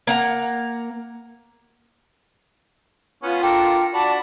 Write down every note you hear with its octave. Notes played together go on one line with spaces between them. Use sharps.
A#3 F#5 A#5
B3 C#4 F4
D4 A4 A#4 G5
D4 F#4 D5 A5 B5